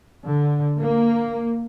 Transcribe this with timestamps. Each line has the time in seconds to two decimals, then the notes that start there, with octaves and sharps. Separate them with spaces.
0.25 D3
0.80 A#3